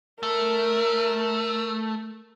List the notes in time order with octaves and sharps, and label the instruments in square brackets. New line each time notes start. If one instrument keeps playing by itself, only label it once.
[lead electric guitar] A3 [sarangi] A#4